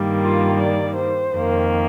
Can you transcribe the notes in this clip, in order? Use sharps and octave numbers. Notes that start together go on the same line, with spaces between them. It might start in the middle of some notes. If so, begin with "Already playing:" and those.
Already playing: G2 D#3 G3 A#3
F4
D5
C5
F2 D#3 A#3